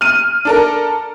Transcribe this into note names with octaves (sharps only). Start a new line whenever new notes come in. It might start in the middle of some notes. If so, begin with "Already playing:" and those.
F6 D#7
D4 A4 A#4